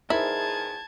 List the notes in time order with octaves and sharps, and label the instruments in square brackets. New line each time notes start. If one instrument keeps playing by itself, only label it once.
[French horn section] E2 G#4 [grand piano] D#4 A#4 C5 [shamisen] E4 [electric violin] A5 G#6